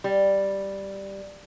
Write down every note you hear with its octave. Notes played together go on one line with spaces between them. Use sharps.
G3